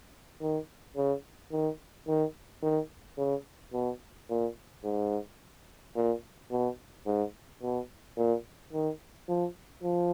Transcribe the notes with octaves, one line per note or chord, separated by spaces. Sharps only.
D#3
C#3
D#3
D#3
D#3
C#3
B2
A#2
G#2
A#2
B2
G#2
B2
A#2
D#3
F3
F3